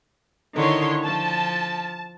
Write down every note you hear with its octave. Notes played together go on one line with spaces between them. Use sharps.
D3 D#3 E4 C#5 C6
F3 A5